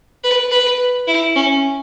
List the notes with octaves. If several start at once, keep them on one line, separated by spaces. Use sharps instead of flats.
B4
B4
E4
C#4